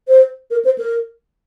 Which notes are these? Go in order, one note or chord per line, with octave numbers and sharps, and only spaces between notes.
C5
A#4
C5
A#4